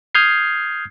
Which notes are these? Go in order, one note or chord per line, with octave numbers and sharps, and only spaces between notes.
D#6 F6 G6 G#6 C7